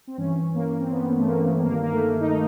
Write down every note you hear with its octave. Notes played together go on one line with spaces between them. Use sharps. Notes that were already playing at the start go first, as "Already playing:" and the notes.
C4
G2 E3 C#4
A#3
C4
B3
A3
A#3
G2 D#3 A#3
A#3
A3
A#3
D#4